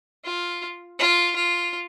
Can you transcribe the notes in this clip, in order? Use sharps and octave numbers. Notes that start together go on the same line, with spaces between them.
F4
F4
F4